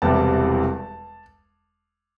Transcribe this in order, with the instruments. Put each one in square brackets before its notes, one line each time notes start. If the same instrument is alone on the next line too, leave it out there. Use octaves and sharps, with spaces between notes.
[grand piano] E1 E2 C3 E3 G3 A5